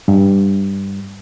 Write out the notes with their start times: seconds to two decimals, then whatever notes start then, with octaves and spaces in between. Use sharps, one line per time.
0.08 G2